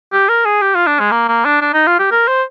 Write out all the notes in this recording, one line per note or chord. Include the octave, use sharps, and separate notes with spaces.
G4
A#4
G#4
G4
F4
D4
G#3
A#3
A#3
D4
D4
D#4
F4
G4
A#4
C5